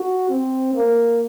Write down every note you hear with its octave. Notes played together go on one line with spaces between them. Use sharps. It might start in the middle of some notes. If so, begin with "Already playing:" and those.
Already playing: F#4
C4
A#3